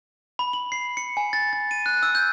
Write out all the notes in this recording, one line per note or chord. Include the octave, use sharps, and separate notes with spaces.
B5
F#7
C7
C#7
G#5
A6
A6
D#7
F#6
E6
G6